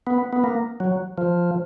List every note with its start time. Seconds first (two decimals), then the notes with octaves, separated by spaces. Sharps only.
0.07 B3
0.33 B3
0.44 A#3
0.80 F#3
1.18 F3